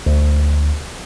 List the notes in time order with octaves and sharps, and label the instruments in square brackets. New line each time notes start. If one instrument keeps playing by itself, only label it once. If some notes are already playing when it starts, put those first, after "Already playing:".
[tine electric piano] D2